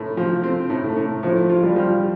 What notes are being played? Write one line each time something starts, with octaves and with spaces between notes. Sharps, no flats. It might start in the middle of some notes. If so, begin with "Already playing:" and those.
Already playing: A2 A3
F3
C4
A2
A3
A2
A2 F3
F4
G3
F3